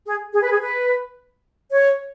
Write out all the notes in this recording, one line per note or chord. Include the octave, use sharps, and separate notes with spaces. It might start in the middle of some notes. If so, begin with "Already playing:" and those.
G#4
G#4
B4
G#4
B4
C#5